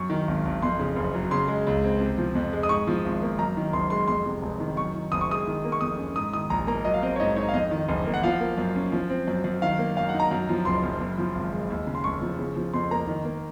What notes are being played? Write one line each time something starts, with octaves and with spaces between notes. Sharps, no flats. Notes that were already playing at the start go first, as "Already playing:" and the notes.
Already playing: F#2 C#6
D#3
G#1
G#1
F2 C6
C#3
F#1
F#3
C#3 C6
G#3
C#2
C4
C3
F3
F2
G#3
D#6
G#2 C#6
F3
G#1
A#3
F#2 A#5
D#3
F#1 C6
G#3 C6
F2 C6
C3
F1
D#3
F#2 C#6
D#3
F#1 D#6
C#6
G#3 D#6
D#3
A#3
C#6
F2 D#6
C#4
G#2 D#6
D#3 D#6
A#1 A#5
A#3 A#5
F#3 D#5
F5
C4 D#5
C#5
G#2 D#5
D#4 C#5
F5
F2 D#5
D#3
F#1
A#3
F#5
F3 F5
A#3
F#2
C#4
F3
C4
F#2
F#2
D#3 F5
A#3
F#2 F5
F#5
D#4
A#5
F#2
F3
F#1 C6
F#1
F#2
F3
G#1
G#3
D#2
C#3
C6
F1 C#6
F3
C#3
F3
F2 C6
A#3 A#5
D#3
A#3